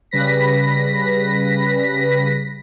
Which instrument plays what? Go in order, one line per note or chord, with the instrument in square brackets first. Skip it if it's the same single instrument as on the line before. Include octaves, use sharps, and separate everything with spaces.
[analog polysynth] C#3 G3 B4 A#6 B6